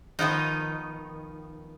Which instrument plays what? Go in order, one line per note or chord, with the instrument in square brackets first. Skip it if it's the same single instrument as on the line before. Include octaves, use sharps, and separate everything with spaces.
[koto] D#3 F3 B3 D#4